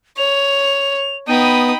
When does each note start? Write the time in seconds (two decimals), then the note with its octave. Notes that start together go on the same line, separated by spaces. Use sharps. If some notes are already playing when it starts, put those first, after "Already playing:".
0.18 C#5 F7
1.28 B3 D#4 G5 B5 D#6 D#7